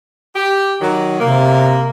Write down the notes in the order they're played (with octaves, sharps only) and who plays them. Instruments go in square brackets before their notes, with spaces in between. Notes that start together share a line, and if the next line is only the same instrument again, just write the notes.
[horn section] G4
D#3 F#3
[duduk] C3 [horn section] A#3